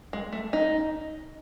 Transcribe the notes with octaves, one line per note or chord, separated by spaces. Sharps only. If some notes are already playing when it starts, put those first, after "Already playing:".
G#3
A3
D#4